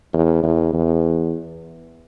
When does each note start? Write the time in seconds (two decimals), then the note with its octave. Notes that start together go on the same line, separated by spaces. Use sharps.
0.13 E2
0.43 E2
0.74 E2